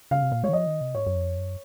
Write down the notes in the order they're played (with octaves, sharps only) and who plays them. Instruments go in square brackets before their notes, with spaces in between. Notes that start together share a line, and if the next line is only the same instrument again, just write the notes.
[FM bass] C#3 [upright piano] F5
[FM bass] C3
A#2
[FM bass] G#3 [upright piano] C#5
[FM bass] D#3
[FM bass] F3 [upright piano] D#5
[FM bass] D#3
C3
[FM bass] G#2 [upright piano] C#5
[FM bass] F#2
F2
F#2